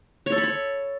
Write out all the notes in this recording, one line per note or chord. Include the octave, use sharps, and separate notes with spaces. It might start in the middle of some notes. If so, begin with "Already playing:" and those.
C#5
A4
B5
C#5